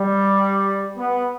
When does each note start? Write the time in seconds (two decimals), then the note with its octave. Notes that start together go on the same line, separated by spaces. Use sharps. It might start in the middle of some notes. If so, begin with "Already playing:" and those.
Already playing: G3
0.97 B3